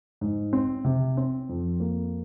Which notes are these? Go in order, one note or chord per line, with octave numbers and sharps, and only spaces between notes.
G#2
C4
C3
C4
F2
A#3